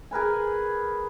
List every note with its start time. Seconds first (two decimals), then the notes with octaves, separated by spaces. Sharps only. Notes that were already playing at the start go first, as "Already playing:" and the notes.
0.11 G#4 A#4 B4 G#5